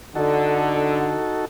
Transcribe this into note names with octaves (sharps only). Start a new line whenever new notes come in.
D3 D#4 F#4 A4